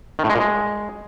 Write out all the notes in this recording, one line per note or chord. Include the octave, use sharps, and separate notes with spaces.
D#3
A2
G#3
A#2
G#3